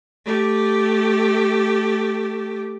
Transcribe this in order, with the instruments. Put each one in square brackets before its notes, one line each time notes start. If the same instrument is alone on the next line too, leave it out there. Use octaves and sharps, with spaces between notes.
[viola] A3 G4